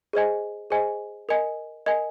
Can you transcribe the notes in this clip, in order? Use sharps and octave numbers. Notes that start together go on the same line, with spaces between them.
G#4 C5 D#5 G#5
G#4 C5 D#5 G#5
A#4 D#5 G#5
A#4 D#5 G#5